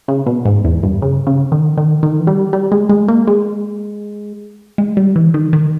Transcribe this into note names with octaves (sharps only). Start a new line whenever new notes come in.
C#3
B2
G#2
E2
G2
C#3
C#3
D#3
D#3
D#3
E3
G3
G3
G#3
G#3
A#3
G#3
G#3
G3
E3
D#3
D#3